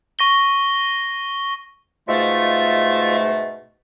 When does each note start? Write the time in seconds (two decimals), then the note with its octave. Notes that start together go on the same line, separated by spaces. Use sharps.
0.19 C#6 A#6 G7
2.08 G#2 B2 A3 F4 E5